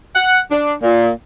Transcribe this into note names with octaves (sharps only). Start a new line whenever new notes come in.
F#5
D4
A#2